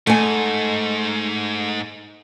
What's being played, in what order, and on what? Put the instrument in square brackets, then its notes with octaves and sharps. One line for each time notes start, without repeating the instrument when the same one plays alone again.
[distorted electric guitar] G#2 [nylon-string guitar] A3 G#5